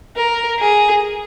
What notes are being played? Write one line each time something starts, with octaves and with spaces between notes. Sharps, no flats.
A#4
G#4